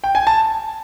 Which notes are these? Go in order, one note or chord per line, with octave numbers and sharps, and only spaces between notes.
G5
G#5
A5